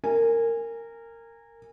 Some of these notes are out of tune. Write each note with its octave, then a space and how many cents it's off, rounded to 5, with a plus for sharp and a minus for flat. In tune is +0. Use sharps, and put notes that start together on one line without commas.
A#4 -20 G#5 -20